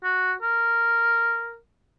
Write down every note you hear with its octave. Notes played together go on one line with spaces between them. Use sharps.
F#4
A#4